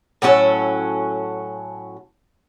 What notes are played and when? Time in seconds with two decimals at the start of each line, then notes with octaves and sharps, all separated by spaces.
0.22 A2 F#3 C#4 A4